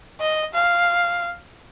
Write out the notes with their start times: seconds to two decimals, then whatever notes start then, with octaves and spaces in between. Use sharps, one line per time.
0.20 D#5
0.54 F5